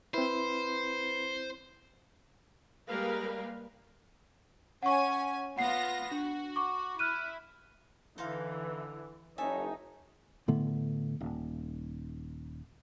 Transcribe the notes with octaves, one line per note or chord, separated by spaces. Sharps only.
C4 E4 B4 C5 B5
G3 G#3 A#3 A#4 B4 F5
C#4 F#5 G#5 C#6
B3 F4 F#5 A#6 C7
D4 F#4
C#6 D6
E4 F6 F#6 D#7
D3 E3 D#4 C5 F5
F#1 D#4 C#5 E5 G#5 A5
A2 D3 A3 B3
D#1